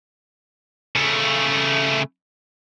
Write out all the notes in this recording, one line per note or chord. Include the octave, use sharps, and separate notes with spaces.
C#3 A3